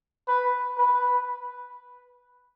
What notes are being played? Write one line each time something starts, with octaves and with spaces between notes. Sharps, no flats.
B4
B4